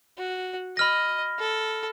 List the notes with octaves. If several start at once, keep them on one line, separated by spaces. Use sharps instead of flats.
F#4
D#5 B5 F6 A#6
A4